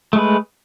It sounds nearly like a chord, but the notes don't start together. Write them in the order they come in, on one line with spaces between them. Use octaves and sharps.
A3 G#3 B4